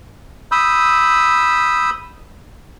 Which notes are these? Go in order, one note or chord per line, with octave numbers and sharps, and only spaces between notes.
B5 D#6 E6 G6